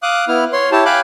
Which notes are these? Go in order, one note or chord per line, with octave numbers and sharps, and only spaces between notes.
F5 D6 D#6 F#6
B3 E4 F6
C#5 C6
E4 G4 C#5 A5
F5 G5 G#5 B5 D6 F#6